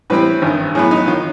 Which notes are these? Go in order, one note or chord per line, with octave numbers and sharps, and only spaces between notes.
A2 E3 G3 C4 B4
G#1 G2 D#3
A2 F#3 B3 G#4
D#4
D#3 F4